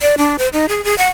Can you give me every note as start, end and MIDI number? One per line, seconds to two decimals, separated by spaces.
0.02 0.16 74
0.18 0.37 62
0.38 0.48 72
0.53 0.66 63
0.69 0.83 68
0.84 0.97 68
0.98 1.08 78